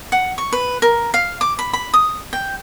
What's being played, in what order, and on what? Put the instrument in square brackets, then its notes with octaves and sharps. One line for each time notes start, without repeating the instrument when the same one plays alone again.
[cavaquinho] F#5
C#6
B4
A#4
F5
D6
B5
B5
D#6
G5